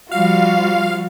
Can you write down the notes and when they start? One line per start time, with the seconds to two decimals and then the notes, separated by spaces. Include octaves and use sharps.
0.11 F3 G3 F4 F#4 F5